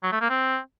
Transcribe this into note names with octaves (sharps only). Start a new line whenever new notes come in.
F#3
A3
A#3
C4